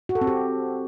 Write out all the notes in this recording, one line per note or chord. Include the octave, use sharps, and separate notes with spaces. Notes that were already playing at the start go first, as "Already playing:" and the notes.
F#4
A4
C4
G4